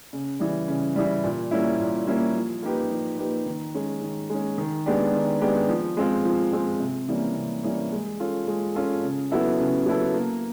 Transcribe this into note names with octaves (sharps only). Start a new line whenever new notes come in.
C#3
E3 G3
C#3
E3 G3
A#2
G3 A#3 C#4 E4
A#2
G3 A#3 C#4 E4
F3
A#3 D#4 G4 B4
F3
A#3 D#4 G4 B4
D#3
G#3 C#4
D#3
G#3 C#4
D#3
G#3 B3 D4 G4
D#3
G#3 B3 D4 G4
F3
G#3 C4 F4
F3
G#3 C4 F4
C3
E3 G3 A#3 C#4
C3
E3 G3 A#3 C#4
G#3
C#4 F4 A4
G#3
C#4 F4 A4
C#3
F#3 B3 E4 A4
C#3
F#3 B3 E4 A4
A#3